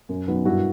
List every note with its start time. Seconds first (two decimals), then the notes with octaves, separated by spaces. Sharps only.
0.09 F#2
0.28 D#3 F#3 B3
0.45 G2 E4 F#4